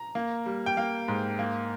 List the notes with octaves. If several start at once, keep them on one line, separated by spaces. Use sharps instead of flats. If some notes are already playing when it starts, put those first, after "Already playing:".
Already playing: A#5
A#3
G3
G5
A#3 F5
G#2
A#3